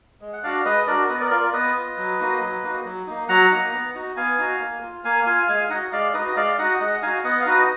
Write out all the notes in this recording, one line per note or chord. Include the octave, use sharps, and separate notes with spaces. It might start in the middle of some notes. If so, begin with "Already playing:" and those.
G#3
F#5
D4 F#4 D5 F5
G#3 B4 D#5
D4 F#4 A#4 D5
B3 B4 D#5
A#4 D5
F4 A#4 D5
A#4 D5
B3 B4 D#5
F4
F#3
A#3 D#4 F#4
F#3
A#3 D#4 F#4
F#3
A#3 D#4
F#3 F#5 A#5
A#3 D#4
B3
D#4 F#4
B3 F5 G#5
D#4 F#4
A#3
F4
A#3 F5 G#5
F4 F5 G#5
G#3 F5 G#5
D#4 F#4 D#5 F#5
G#3 D5 F5
D#4 F#4 B4 D#5
D#5
G#3 D5 F5
D#4 F#4 D#5 F#5
G#3 D#5 F#5
D#4 F#4 F5 G#5
B3 D#5 F#5
F5
D#4 F#4 B4 D#5